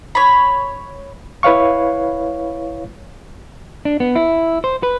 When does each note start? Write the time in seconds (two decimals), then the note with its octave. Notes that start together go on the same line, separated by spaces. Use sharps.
0.15 C#5 B5
1.43 E4 B4 C#5 F5 C#6
3.85 D4
4.00 B3
4.16 E4
4.64 C5
4.83 B4